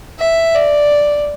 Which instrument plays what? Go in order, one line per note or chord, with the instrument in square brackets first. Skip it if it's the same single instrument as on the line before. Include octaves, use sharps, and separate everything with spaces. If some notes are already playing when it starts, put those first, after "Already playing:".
[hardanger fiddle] E5
D5